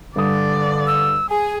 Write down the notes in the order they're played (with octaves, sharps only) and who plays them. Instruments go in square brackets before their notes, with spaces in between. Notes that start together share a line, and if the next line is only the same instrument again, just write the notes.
[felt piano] G2 D#6 [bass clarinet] D3 [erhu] D5
[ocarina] E6
[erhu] G#4 [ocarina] G#5